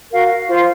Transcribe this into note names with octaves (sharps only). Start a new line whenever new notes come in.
F#4 A#4 F5
F4 C5 F5